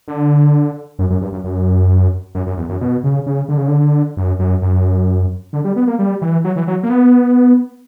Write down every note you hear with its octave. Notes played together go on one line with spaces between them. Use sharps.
D3
F#2
F#2
G2
F#2
F#2
F#2
F#2
E2
F#2
B2
C#3
C#3
D3
C#3
D3
F#2
F#2
F#2
D3
G3
B3
A#3
G3
E3
F#3
E3
F#3
A#3
B3